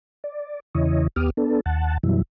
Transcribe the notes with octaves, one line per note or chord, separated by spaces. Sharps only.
D5
E2 C#3 E3 E4 C#5 D#5
D#2 B3 G4 D6 D#6 F6
B3 D4 A4
D#2 F#5 A5
F#2 B2 E3 F#3 G3 E4